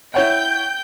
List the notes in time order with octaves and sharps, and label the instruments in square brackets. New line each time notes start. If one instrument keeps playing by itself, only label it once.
[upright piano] E4 C#5 F#5 [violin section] G5 G6